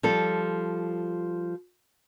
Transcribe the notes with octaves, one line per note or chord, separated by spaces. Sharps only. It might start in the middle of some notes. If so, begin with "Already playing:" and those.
F3 G3 A4